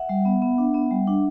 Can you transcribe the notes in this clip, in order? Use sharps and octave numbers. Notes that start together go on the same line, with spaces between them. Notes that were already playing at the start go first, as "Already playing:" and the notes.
Already playing: E5 F#5
G3
B3
B3
D4
B3
G3
D4